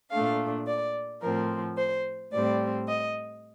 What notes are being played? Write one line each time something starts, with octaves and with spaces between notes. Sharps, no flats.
A#2 A3 D4 F5
D5
A2 F3 C4 A#4
C5
A2 G3 C4 D5
D#5